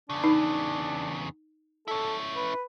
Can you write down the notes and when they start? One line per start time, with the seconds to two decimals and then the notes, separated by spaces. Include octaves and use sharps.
0.10 E2 C#3 D4
0.24 D#4
1.88 C#4 E4 A4
2.36 B4